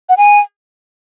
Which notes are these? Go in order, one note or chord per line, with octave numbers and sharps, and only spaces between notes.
F#5
G#5